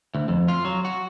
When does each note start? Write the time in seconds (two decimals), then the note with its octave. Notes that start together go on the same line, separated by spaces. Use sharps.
0.15 D2
0.28 F2
0.48 F4
0.65 F#3
0.85 F#4